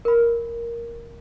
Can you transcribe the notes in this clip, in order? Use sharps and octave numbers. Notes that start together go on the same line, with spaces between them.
A#4 B5